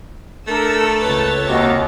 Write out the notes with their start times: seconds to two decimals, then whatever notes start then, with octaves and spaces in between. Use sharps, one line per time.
0.47 A3 D4 A4 A#4 E6
1.01 C#2 A4 B4 C#5 E6 A6
1.47 D#2 C3 F#4 D#5